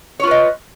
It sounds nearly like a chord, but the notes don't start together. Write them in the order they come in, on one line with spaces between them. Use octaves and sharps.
C#5 F4 B4 D#5